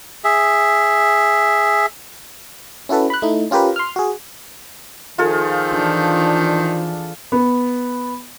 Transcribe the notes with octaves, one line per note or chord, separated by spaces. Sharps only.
G#4 E5
C#4 E4 F#4 A4 B4
B5 F#6
A3 D#4 E4
C#4 F4 G4 A#4 B4
C6 F6
F#4 G#4
D#3 F3 F4 G#4 A4
E3 D4
B3